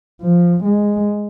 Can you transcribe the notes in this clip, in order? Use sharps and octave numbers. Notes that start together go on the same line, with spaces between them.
F3
G#3